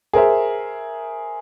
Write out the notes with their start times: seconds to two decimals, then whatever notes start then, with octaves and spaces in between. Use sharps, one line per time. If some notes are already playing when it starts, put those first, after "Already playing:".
0.13 G#4 A#4 C5 E5